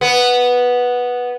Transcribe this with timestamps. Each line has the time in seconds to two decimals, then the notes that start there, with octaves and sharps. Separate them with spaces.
0.01 B3